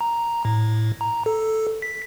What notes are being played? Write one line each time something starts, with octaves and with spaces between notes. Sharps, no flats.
A#5
A2
A#5
A4
B6